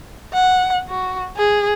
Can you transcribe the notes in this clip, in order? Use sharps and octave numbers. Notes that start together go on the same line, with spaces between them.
F#5
F#4
G#4